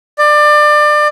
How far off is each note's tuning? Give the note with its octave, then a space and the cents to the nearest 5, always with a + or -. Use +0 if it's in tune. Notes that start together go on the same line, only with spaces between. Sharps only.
D5 +25